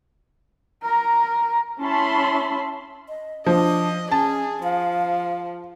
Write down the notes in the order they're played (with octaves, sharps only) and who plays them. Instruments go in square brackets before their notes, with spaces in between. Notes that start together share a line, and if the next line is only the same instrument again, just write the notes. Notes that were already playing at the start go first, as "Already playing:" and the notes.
[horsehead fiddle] A#4 A#5
[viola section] C#4 E4 E5 A5 B5 C6
[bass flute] D#5
[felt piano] F3 [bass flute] D4 [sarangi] D#5
[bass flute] C#4 [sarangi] G#4 [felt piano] A5
[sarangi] F3 [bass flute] F5